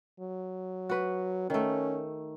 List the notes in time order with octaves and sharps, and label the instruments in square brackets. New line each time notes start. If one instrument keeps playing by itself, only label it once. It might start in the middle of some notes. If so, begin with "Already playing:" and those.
[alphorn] F#3
[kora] F#4 B4
[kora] D#3 A3 [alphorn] C#4